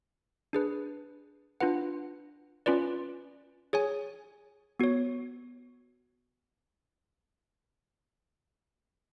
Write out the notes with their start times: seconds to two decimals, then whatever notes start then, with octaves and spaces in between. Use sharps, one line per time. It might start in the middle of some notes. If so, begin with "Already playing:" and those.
0.53 D4 G#4 B4
1.60 D4 F4 B4 F#5
2.66 C#4 F4 B4 D5
3.73 G#4 C#5 G#5
4.79 B3 F#4 C#5